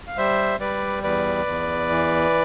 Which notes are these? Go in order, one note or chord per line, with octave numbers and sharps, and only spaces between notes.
F5
G3 C5 E5
G3 B4 D5
E2 B4 D5
E2
E3